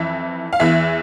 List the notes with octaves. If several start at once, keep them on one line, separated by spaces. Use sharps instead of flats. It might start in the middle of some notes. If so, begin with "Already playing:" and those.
Already playing: F2 E3 E5
F5
E2 E3 E5